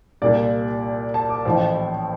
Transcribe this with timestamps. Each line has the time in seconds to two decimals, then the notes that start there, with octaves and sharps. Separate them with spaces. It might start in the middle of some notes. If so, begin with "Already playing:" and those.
0.22 C2 A#2 G3 A#3 D5
1.14 A5
1.30 D6
1.45 A1 A2 F3